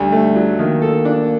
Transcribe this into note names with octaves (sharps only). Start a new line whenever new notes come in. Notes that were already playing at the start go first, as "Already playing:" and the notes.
Already playing: D2 G3 A3
A3
F#3
D#3 A#3
A4
D4